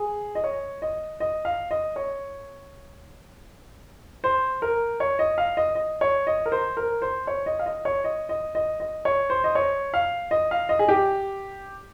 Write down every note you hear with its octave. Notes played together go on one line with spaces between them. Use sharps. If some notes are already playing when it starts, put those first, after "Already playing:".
Already playing: G#4
D#5
C#5
D#5
D#5
F5
D#5
C#5
C5
A#4
C#5
D#5
F5
D#5
D#5
C#5
D#5
A#4
C5
A#4
C5
C#5
D#5
F5
D#5
C#5
D#5
D#5
D#5
D#5
C#5
C5
D#5
C#5
F5
D#5
F5
D#5
G#4
G4